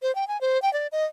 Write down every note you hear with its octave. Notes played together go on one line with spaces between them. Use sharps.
C5
G5
G#5
C5
G5
D5
D#5